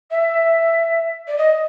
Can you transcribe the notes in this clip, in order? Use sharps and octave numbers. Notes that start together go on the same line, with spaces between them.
E5
D5
D#5